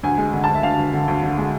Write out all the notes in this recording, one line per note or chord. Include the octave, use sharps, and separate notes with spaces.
D2 G#5
G#3
D3
D2 A5
E5
D2 F5
D2
D3
D2
D3
G#3